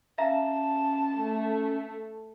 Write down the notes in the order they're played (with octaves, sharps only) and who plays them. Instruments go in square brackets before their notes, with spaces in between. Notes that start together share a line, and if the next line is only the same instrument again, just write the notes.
[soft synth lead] C#4 [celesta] E5 F5 A#5 [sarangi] A5
[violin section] A3